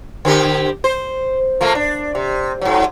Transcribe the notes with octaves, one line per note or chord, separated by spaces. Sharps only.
D3 C4 G4
C5
F3 A3 A#3
D4
C3
G#2 F#3